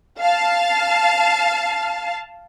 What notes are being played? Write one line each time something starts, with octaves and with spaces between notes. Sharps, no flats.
F5 A5